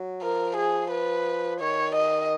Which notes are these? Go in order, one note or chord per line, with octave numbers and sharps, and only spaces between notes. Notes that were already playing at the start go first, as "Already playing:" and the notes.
Already playing: F#3
F3 A#4
G#4
B4
D#3 C#5
D#5